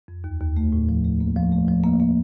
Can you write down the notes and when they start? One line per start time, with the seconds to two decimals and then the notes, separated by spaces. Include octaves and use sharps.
0.08 F2
0.24 D#2
0.40 D#2
0.57 A3
0.73 A2
0.89 F3
1.05 A3
1.20 A#3
1.36 F3
1.52 A3
1.68 F3
1.84 A#3
2.00 A#3